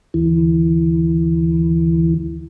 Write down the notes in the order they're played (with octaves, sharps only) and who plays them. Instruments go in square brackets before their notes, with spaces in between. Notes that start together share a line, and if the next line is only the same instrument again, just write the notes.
[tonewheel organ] D2 E3